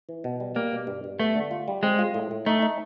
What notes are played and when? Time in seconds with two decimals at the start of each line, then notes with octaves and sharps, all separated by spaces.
0.09 E3
0.24 B2
0.40 G3
0.55 G3 A#3
0.72 B2
0.87 G2
1.04 G2
1.20 A3 B3
1.35 D3
1.51 F4
1.68 G3
1.83 G#3 C4
1.99 F4
2.14 A2
2.31 A2
2.46 A3 D#4
2.62 D#4